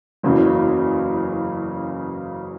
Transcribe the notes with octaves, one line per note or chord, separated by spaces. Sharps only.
F#1 E2 C#3 F#3